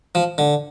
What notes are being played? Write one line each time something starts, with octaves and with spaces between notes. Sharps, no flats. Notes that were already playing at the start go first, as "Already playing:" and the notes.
F3
D3